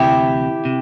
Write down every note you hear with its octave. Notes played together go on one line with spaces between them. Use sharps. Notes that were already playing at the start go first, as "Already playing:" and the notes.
Already playing: D2 C3 E3 E4 G4
C3